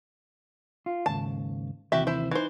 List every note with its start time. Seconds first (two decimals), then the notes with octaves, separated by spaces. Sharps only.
0.86 F4
1.06 D#2 G#2 C#3 A5
1.92 D#2 C3 E3 F#4 G4 E5
2.07 E4 C5
2.31 E3 D#4 C5